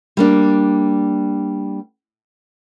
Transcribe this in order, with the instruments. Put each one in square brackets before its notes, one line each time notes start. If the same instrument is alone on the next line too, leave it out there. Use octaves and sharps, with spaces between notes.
[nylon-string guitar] G3 A#3 D4